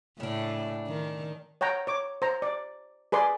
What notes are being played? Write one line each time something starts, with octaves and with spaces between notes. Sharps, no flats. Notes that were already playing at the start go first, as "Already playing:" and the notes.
A2 C#3 D4
D#3
C#5 F#5 G5 A#5
C#5 D6
C5 A#5
D5
G#4 B4 D5 C6